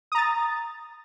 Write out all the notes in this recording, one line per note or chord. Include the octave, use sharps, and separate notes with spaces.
A#5 D#6 A6